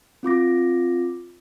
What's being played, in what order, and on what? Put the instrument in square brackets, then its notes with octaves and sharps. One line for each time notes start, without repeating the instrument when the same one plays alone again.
[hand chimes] C4 F4 D6 A#6